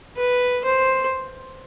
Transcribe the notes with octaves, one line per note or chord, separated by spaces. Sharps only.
B4
C5